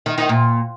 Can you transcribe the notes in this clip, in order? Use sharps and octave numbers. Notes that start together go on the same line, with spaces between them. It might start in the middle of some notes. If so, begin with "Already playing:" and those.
D#3
D#3
A#2